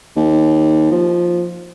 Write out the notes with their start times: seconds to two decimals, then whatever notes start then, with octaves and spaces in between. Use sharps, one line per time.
0.16 D#2
0.91 F3